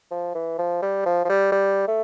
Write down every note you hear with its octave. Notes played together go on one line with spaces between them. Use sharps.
F3
E3
F3
G3
F3
F3
G3
G3
A3